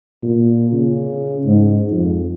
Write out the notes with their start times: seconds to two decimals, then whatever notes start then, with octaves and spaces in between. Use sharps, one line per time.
0.23 A#2
0.73 C#3
1.46 G#2
1.91 F2